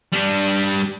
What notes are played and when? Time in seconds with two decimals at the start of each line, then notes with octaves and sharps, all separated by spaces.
0.12 G3 D4